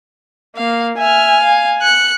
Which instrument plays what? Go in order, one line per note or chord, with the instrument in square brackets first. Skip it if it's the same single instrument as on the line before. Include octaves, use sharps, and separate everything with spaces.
[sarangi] A#3 [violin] F5
[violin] E5 F6 [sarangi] G#5
[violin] F5
F#6 C#7